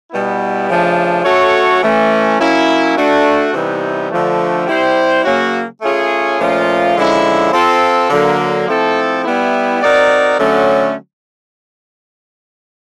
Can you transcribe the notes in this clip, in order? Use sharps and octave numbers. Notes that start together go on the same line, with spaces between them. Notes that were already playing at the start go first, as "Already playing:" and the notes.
B2 G3 B3 E4
C#3 F3 A3 D4
A3 C#4 F#4 A4 C#5
E3 A3 C#4
F#3 A#3 C#4 E4
A3 D4 F#4
C3 E3 G3 B3 D#4
D3 F3 A3
G3 C4 E4 G4 C5
C#3 F#3 A#3 C#4 F#4
A3 C#4 F4 G#4 C#5
A#2 F3 A3 C#4 F4
D3 F3 G#3 C#4 E4
C4 F4 A4
D3 F#3 A#3
F3 A3 C4 E4 A4
G3 B3 E4
C4 D#4 F#4 A#4 D5
D3 F#3 A3 C#4